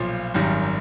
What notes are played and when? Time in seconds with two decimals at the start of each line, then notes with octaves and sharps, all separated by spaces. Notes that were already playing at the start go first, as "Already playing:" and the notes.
Already playing: B1 A#2 F3 F4
0.34 G#1 F#2 D#3 G3